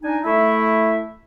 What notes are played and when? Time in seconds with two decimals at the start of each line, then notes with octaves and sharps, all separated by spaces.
0.02 D4 D#4 G#5
0.23 A3 E4 E5